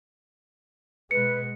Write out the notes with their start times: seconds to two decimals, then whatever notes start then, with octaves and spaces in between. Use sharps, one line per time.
1.11 B2 G#3 B4 C#7